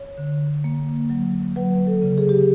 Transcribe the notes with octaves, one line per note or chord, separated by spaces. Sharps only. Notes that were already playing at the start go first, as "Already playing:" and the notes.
Already playing: C#5
D3
A#3
F#3
F#3 B4
A4
C#3
G#4
G4